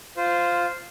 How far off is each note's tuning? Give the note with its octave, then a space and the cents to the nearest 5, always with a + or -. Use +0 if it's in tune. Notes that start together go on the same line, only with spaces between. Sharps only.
F4 +0 C5 -10